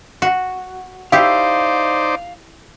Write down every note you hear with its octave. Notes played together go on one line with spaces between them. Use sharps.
F#4
D#4 E4 G4 C5 D5 F5